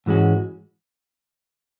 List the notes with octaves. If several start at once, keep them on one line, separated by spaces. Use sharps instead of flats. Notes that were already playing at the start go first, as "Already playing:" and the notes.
G#2 E3 G#3 C#4 F#4